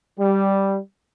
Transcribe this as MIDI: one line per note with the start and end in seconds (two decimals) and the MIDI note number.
0.19 0.78 55